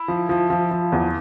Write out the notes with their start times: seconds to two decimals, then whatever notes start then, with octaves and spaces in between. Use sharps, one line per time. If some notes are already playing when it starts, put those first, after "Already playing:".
Already playing: E4
0.08 F3
0.29 F3
0.50 F3
0.71 F3
0.92 E2